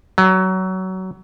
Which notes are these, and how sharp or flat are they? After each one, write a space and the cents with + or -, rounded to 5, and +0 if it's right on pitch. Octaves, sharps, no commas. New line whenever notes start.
F#3 +20